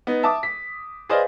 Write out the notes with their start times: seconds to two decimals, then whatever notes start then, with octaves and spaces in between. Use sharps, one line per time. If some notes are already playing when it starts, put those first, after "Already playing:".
0.07 B3 D#4
0.23 E5 A5 D6 D#6
0.43 B6
1.09 G#4 B4 C5 D5 D#5 F5